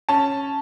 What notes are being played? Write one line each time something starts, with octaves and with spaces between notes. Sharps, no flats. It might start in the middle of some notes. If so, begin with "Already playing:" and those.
C#4 A5